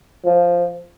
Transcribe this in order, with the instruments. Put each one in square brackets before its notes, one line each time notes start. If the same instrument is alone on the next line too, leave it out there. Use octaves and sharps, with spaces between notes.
[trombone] F3